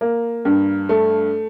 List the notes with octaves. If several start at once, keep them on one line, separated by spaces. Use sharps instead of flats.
A#3
G2
A3